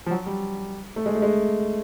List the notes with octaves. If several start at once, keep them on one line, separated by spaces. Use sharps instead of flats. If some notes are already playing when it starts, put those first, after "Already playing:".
F3
F#3
G3
A3
G#3
A3
G#3